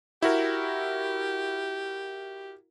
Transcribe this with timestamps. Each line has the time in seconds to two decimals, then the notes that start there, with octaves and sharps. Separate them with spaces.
0.22 E4 F#4 G4 A#4